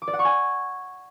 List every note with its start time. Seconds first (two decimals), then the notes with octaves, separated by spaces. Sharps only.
0.02 D6
0.08 D5
0.13 F#5
0.19 C#6
0.25 G#5